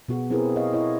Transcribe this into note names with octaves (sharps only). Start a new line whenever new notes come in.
B2 B3 F#4 G#4
C4 E4 G4 G#4 A#4 B4
C#5 D#5 F5
E4 C#5 D#5